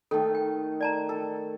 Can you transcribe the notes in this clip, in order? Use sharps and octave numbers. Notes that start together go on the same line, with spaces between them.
D#3 A3 A4
G5
D5 A5 A#5
A4